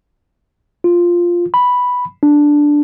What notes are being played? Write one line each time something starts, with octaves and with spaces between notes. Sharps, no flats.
F4
B5
D4